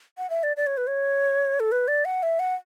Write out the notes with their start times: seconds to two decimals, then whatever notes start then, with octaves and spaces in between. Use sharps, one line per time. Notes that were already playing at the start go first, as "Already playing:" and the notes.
0.18 F#5
0.30 E5
0.43 D5
0.57 D5
0.67 C#5
0.77 B4
0.87 C#5
1.60 A4
1.72 B4
1.88 D5
2.05 F#5
2.23 E5
2.39 F#5